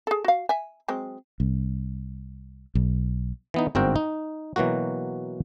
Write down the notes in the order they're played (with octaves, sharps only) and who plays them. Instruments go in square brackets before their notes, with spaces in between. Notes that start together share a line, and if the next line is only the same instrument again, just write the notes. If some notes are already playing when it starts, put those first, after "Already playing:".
[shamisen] G#4 A4
F#4 F5
E5 G#5
F#3 G#3 C4
[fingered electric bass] C2
B1
[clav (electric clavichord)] E3 B3 D#4
G1 G#2 C4 F#4 A#4 G5
D#4
B2 E3 F#3 A#3 F#4